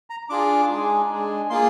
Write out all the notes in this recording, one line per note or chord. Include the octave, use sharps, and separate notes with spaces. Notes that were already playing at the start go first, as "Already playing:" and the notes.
A#5
D4 F4 G#4 D6
G#3 D#4 G#4
G#3 D4 G#4
A#3 F4 G#4 C6